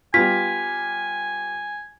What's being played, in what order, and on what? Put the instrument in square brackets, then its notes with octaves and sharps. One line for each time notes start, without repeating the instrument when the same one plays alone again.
[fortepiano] G3 B3 F4 [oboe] G#5 [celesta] B6